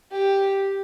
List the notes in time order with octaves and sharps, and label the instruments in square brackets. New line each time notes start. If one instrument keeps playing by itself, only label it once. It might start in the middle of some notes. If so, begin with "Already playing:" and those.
[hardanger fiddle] G4